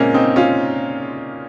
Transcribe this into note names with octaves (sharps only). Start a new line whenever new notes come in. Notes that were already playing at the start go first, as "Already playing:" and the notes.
Already playing: A#2 C#3 G#3 A#3 C4 C#4
C4 D#4
C#4 F4